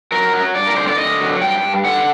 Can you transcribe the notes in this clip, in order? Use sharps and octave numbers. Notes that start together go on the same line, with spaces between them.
F#3 A#4
F#3
G2 D5
A#4
D3 C5
D5
D3 D#5
F#3
G2 G5
G2
D3 F#5